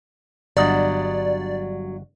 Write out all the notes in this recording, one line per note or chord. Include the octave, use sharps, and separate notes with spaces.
G1 F#3 G3 D4 D5 D#5